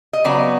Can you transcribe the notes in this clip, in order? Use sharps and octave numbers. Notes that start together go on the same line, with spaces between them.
D#5
C#3 F#3 B3 D5